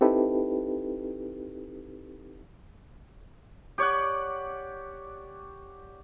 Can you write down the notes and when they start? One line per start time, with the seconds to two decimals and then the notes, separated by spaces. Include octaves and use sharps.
0.01 C4 D#4 E4 G4 A4 B4
3.78 G4 C#5 D5 F#5